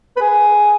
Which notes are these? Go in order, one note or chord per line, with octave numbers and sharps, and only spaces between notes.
B4
G#4